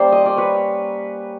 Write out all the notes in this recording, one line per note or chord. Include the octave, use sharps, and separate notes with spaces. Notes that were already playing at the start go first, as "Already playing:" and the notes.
Already playing: G3 A#3 C#4 C5 D5
D#5
D5
B4 C#5